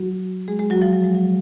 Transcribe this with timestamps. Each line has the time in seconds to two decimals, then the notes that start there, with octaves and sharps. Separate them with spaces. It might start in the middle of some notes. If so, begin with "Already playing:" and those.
Already playing: F#3 F#4
0.48 G#3 G#4
0.59 G#3 G#4
0.70 F#3 F#4
0.82 F3 F4
0.93 F#3
1.04 G#3
1.15 F#3